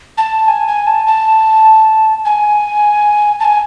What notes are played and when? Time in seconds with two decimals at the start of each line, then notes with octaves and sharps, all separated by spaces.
0.18 A5
0.48 G#5
0.67 G#5
0.87 A5
1.07 A5
2.25 G#5
3.40 A5
3.45 G#5